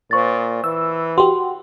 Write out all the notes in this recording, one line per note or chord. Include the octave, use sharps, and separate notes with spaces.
A#2 C5 C#6 A6
E3 E6
F#4 G4 C6